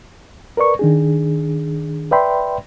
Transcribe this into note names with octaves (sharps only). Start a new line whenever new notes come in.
A#4 B4 D5 C#6
D#3 D4 G#4
B4 D5 E5 G5 B5 C6